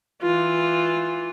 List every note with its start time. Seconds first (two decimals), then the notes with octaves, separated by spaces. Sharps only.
0.22 E3 F4